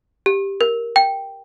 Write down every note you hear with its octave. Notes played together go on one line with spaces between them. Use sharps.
G4
A#4
G5